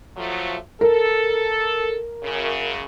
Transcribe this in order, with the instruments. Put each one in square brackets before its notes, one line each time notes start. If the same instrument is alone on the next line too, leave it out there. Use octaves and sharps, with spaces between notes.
[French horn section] F3 F#3 A3
[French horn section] A4 [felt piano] A#4
[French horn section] F#2 C#3